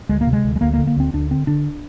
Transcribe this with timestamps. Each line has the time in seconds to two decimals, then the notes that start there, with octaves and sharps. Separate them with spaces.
0.09 D2 G#3
0.21 A#3
0.27 C3
0.33 G#3
0.44 D2
0.56 G#3
0.61 D2 A#3
0.74 D3 A#3
0.87 A#3
0.96 D2 C4
1.13 D2 D4
1.31 D3 C4
1.47 D3 D4